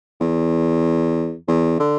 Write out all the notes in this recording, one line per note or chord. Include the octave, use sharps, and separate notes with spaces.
E2
E2
D3